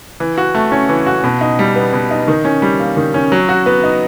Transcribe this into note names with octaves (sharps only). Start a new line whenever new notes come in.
E3
F#4
A3
C#4
E3
F#4
B2
D#4
G3
B3
B2
D#4
D#3
C#4
G3
A#3
D#3
C#4
F#3
F#4
B3
D#4